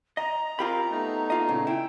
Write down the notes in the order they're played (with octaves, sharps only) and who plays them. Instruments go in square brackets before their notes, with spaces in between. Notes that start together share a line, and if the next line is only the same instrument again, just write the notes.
[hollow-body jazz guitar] D#5 [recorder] A#5
[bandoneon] C4 A#4 F5 [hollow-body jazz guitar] F4 G4 B5
[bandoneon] A3 B3 D#4
[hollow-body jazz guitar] A#3 F4 D#5
A#2 C#3
[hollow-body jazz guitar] E4 [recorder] G5